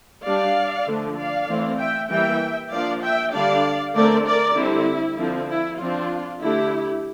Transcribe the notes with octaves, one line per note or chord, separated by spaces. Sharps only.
G3 D4 D5 F5
D3 F3 A3 D4
D5 F5
E3 A3 C4
E5 G5
E3 G3 A#3 E5 G5
F3 A#3 D4 D5 F5
E5 G5
D3 G3 D4 D5 F5
D3 A3 C4 A#4 D5
A#4 D5
D3 G3 C4 E4
D3 F3 C4
E4
F3 C4 D4 F4
D3 A3 D4 E4 G4